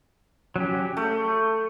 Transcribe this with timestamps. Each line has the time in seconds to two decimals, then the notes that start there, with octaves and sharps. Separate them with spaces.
0.56 F#3 C#4 G4
0.97 A3